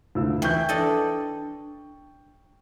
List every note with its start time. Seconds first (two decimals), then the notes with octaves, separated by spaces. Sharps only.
0.15 D2 F4 E6
0.42 E3 G5 C#6 G6
0.69 D4 A4 D#5